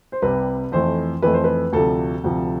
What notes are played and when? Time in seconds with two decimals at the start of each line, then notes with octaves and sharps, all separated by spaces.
0.12 C5
0.22 C2 C3 G3 B4
0.72 F2 E3 A3 C5
1.22 F2 E3 A3 B4
1.33 C5
1.44 B4
1.72 D2 C3 F3 A4
2.24 D2 C3 F3